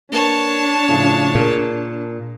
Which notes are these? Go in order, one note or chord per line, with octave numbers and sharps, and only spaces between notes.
A#3 D4 B4 C#5 A5
A2 C#3 F3
A#2 G#4 A#4